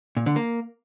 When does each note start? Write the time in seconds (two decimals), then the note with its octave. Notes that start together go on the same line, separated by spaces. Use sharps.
0.17 A#2
0.26 D3
0.36 A#3